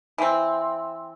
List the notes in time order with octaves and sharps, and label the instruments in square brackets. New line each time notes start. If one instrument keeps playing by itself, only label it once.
[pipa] E3 C4